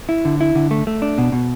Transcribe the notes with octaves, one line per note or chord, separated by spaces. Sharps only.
E4
D3
E4
D3
A3
A3
D4
B2
B2